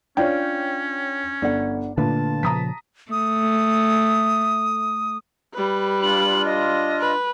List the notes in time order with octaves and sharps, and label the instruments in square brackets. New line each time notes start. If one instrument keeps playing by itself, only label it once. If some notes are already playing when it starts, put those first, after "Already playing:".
[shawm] C#4 [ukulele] D4 F4 [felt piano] C#5 G5
[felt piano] G1 [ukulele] D4 F#5
[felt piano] A#2 [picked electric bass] D3 A3 D4 [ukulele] B4 [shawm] A5
[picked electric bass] A#2 C#3 F3 [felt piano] A#5 D#6 B6
[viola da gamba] A3 [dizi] D#6
[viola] G3 B4
[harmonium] D4 F4 [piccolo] F#7
[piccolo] D#5
[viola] B4